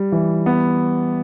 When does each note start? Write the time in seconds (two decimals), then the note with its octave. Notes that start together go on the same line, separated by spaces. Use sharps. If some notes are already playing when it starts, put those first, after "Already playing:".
Already playing: G3
0.12 E3
0.46 B3